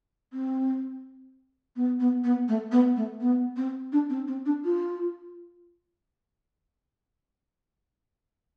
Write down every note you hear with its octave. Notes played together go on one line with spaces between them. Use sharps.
C4
B3
B3
B3
A3
B3
A3
B3
C4
D4
C4
C4
D4
F4